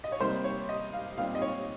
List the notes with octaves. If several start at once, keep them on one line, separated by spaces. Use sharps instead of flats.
D#5
C#5
C3 G3 A#3 D#4 C5
C#5
D#5
F5
A#2 G3 C4 D#4 F5
D#5
C#5